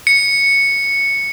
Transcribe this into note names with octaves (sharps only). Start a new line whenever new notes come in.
C#7